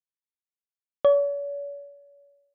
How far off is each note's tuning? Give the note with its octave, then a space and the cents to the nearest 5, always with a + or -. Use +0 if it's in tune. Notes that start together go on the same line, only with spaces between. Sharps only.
C#5 +45